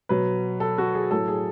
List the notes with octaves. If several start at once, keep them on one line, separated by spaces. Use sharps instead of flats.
B2 F#3 B4
A4
F#4
G#4
A2 F#3 A4
G#4